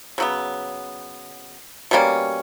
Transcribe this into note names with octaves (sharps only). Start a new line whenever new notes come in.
C#3 F#3 B3
B2 G3 A#3 C#4